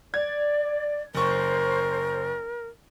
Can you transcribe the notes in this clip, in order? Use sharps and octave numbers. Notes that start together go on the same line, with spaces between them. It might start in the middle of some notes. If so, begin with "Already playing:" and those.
D5 G#6
F#1 A#4 C5 C#6